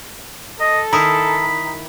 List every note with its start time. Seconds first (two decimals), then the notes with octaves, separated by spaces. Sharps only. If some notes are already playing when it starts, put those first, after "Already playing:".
0.60 A4 D#5
0.93 D#3 E4 A#5 B5 D#6